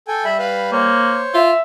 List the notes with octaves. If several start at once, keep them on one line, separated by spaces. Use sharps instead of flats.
A4 G5 G#5
G3 E5 B5
B4 F5 B5
A#3 C5 C#5
F4 E5